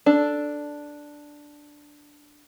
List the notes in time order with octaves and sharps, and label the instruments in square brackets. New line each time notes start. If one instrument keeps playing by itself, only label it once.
[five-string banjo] D4 A4